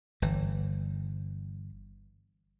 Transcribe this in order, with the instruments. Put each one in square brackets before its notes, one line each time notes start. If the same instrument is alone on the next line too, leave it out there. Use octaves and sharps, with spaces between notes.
[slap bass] G1 E3